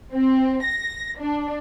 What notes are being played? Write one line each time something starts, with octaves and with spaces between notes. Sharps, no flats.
C4
A#6
D4